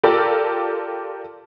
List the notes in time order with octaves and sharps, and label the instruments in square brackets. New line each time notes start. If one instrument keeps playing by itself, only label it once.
[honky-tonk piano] F4 G4 A4 A#4 D5